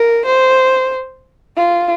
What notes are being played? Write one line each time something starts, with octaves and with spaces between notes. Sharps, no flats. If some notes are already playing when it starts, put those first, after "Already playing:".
Already playing: A#4
C5
F4